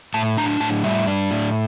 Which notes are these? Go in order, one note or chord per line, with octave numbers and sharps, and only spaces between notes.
A2 A5
D4 A#5
A2 A5
G3 E5
D4
A2